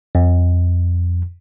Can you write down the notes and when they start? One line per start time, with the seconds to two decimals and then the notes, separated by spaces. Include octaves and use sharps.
0.15 F2